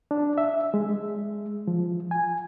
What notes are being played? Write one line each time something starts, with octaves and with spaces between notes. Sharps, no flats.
D4
E5
G#3
F3
G#5